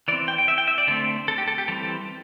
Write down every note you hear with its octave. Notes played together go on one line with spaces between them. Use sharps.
E3 C4 D5
G5
G5
E5
G5
E5
D5
D3 A3 C4 A4
A4
G4
A4
G4
E3 G3 C4 A4